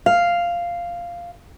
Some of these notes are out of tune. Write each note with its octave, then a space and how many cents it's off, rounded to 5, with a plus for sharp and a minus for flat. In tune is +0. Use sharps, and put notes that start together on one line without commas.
F5 -5